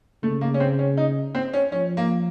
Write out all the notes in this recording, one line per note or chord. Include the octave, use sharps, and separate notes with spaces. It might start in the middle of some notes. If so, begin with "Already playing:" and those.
C#3 A3
A#3
C#4
C4
C#4
D#4
C4
C#4
F3 C#4
A#3